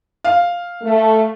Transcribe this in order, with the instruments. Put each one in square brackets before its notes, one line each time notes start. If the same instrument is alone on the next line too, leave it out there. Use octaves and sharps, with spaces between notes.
[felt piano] F5
[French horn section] A3